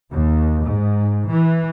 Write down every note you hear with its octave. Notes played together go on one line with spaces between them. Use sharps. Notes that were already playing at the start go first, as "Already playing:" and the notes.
D#2
G#2
E3